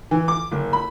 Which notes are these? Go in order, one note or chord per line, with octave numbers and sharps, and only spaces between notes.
E3
D6
F#1
B5